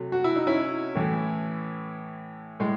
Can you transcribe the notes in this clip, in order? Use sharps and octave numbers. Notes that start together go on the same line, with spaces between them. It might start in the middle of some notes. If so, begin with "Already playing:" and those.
Already playing: C3 F#3 A3
F#4
E4
D#4
C#4 E4
A2 E3 A3
A2 G#3